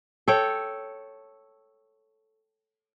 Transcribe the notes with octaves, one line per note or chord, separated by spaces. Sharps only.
A4 C#5 G5